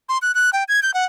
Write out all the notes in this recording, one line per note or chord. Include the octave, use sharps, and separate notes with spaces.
C6
F#6
F#6
G5
G#6
G6
F#5